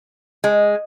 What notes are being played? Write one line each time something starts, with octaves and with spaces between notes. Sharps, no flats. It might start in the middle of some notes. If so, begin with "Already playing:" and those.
G#3